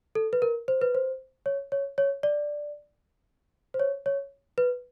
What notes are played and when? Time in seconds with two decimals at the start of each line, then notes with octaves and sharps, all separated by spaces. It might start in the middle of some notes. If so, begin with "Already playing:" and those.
0.15 A4
0.33 B4
0.42 A#4
0.68 C5
0.81 B4
0.95 C5
1.46 C#5
1.72 C#5
1.98 C#5
2.23 D5
3.74 C5
3.80 C#5
4.06 C#5
4.58 B4